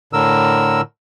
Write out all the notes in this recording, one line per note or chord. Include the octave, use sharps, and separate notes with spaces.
A2 D3 A#4 E6